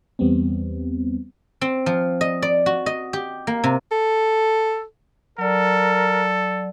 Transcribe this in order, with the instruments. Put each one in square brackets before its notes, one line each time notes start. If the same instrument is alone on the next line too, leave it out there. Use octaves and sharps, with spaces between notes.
[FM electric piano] E2 G3 B3 C4
[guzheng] C4
F3
D#5
D5
F#4
D#5
G4
A#3
C3
[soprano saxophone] A4
[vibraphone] F#3 D5 [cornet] A4 [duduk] A#4